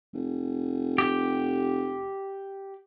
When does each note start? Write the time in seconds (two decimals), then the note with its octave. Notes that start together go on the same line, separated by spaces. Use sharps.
0.13 F1
0.98 G4